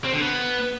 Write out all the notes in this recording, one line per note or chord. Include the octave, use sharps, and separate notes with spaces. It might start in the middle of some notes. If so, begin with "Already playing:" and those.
C4
D3
B3